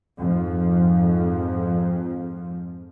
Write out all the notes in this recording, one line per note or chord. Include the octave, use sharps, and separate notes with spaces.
F2 G#2 F3